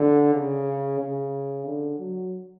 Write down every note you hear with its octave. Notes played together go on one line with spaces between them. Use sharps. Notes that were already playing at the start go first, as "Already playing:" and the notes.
Already playing: D3
C#3
C#3
D3
F#3